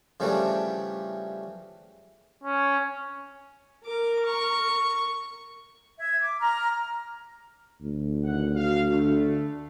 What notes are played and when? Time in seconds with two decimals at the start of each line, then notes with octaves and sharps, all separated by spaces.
0.20 C#3 E3 F3 G3 A3 D4
2.44 C#4
3.86 A#4 D6
4.26 C#6
6.00 E5 G#6
6.21 D6
6.40 A#5 F6
7.81 D2
8.24 G#1 F#5
8.56 F#4 F5
8.90 D3 A3